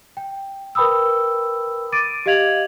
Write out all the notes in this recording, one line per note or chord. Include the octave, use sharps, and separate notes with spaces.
G5
A#4 B4 G5 B5 D#6 E6
D6 A6 D7 D#7
G4 D#5 F5 G#6 F7 F#7